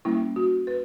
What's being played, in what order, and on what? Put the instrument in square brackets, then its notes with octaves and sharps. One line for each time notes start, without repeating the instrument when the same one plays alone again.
[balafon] G3 A#3 C#4 E4
F#4
B4